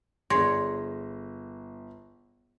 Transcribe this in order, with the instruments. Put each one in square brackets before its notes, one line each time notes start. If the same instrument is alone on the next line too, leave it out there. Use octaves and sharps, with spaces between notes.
[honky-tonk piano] G1 A#6 [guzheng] G#4 C#5 D5 [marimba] C6